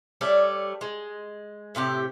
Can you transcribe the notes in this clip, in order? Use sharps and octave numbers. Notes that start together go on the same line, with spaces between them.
G3 A3 C#5 D5
G#3
A2 C3 E4 G4